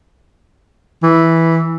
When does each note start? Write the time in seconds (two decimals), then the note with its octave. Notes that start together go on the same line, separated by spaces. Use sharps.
1.03 E3